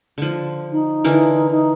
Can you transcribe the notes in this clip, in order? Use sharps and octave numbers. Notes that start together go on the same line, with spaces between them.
D3 F3
D#4
D3 E3 A#4
D#4